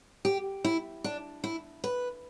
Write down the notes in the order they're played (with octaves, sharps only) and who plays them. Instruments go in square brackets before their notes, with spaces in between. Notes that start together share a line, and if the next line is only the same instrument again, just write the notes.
[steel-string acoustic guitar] G4
E4
D4
E4
B4